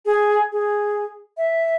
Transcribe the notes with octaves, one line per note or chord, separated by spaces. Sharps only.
G#4
G#4
E5